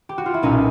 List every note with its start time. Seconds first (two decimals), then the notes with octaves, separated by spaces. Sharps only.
0.09 G4
0.18 F#4
0.26 F4
0.34 E4
0.42 B1 A#2 C#4 D#4